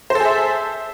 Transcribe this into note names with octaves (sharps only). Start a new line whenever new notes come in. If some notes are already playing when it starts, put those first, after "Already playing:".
G#4 A4 C5 E5